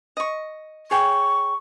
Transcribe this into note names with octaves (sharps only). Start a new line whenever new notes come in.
D#5 C#6
G#4 C#5 G5 C#6